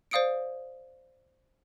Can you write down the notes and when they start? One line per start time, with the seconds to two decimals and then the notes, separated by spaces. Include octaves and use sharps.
0.11 C5 D5 F5 D#6 C#7 D7